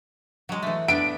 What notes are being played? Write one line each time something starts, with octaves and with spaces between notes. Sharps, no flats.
F#3 G#3
E3 A3
B3 D4 D7